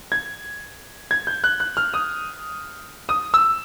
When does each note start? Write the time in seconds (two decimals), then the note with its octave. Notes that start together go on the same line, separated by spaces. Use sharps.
0.12 G#6
1.11 G#6
1.27 G6
1.44 F#6
1.60 F#6
1.77 F6
1.94 D#6
3.09 D#6
3.34 E6